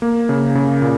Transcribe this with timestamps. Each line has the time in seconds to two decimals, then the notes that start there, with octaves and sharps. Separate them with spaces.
0.02 A#3
0.29 C#3
0.55 C#3
0.82 A#2